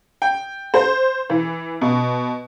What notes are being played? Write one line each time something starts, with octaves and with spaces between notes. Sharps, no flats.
G5
C5
E3
B2